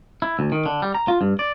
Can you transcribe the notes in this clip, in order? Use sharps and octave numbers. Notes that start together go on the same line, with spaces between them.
E4
D2
D#3
D3
G3
A#5
F4
G2
D5